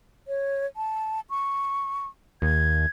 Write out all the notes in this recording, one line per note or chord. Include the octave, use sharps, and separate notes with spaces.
C#5
A5
C#6
D#2 G#6